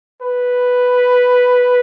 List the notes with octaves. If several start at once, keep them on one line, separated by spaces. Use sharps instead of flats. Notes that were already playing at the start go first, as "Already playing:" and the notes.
B4